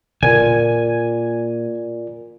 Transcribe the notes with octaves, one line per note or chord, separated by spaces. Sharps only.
A#2 F4 A#4 D5 G#5